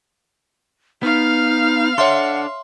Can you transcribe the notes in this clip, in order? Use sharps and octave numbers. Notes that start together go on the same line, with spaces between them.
B3 D#4 F5 F6
D4 A4 C#5 E5 F#5 C6